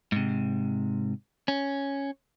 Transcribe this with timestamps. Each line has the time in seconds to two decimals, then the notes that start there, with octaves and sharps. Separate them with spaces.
0.12 G#2 C3
1.48 C#4